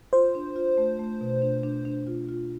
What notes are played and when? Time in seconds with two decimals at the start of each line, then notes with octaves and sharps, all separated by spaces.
0.13 F4 C5
0.35 D4
0.56 F4
0.77 A3
0.99 A3
1.21 B2
1.42 D4
1.63 D4
1.85 D4
2.07 F4
2.29 F4